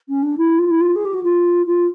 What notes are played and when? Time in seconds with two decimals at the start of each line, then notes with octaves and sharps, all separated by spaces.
0.09 C#4
0.23 D4
0.38 E4
0.58 F4
0.70 E4
0.80 F4
0.96 G#4
1.05 G4
1.14 F#4
1.23 F4
1.67 F4